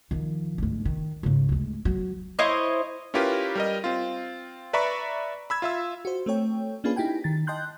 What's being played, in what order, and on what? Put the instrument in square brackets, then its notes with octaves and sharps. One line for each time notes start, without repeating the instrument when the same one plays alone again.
[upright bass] D#3 F3
D2 G#2
D#3
C#2 G#2
D2 G#3
F#3
[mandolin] E4 C5 C#5 D#5
[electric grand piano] C#4 E4 F4 G4 A#4 B4
G3 A#4 D#5
C4 F4
B4 D5 E5 A#5 B5 C#6
B5 E6 G#6
F4 E5 E6
[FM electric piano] F#4 C5
A3 C4 A4 C#5 G5
A#3 C#4 D4 F4 G#4 B4
D#4 E4 G4 G5 G#5
D#3 A6
D#5 G5 A5 C6 F#6 G6